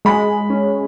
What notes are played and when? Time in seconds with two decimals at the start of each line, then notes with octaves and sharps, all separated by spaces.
0.05 G#3 B5
0.50 C#4